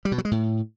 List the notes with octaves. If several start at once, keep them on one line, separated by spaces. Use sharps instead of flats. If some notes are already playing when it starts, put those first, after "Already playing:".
G3
B2
F#3
G#3
A2